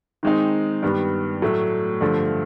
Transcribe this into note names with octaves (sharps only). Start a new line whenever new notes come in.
D#3 G#3 C4 D#4
G2 D#3 G3 B3
A2 F#3 A3
G2 D3 F3 A3